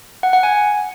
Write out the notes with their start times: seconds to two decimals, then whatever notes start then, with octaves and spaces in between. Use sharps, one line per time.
0.23 F#5
0.33 F#5
0.43 G#5